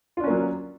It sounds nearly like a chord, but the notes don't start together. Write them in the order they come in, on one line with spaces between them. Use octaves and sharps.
F4 D4 C#4 A#3 F#3